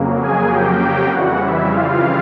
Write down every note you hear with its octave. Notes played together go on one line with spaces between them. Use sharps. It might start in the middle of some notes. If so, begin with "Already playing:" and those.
Already playing: F2 C#3 F#3 A#3
G#4 G#5
G4 G5
F2 C#3 E3 G3 F#4 F#5
E4 E5
F4 F5